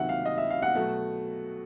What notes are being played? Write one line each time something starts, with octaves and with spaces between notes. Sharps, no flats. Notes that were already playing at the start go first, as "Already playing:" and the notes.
Already playing: C#2 C3 D#3 F#3 E5 F#5
F5
D#5
E5
F5
F#5
B2 F#3 A3